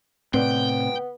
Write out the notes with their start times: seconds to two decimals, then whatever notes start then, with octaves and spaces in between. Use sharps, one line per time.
0.34 A2 C3 B3 C4 B4 D5 G5